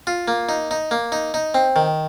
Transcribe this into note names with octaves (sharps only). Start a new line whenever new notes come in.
F4
A#3
D#4
D#4
A#3
D#4
D#4
C4
D#3